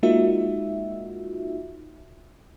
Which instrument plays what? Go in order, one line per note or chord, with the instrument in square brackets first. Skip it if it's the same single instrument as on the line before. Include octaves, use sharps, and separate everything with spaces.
[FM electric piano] G#3 A#3 D#4 F4 F#4 E5